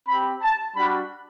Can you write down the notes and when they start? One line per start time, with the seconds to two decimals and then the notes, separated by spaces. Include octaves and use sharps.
0.08 C4 G4 B5
0.43 A5
0.76 G3 D4 F#4 B5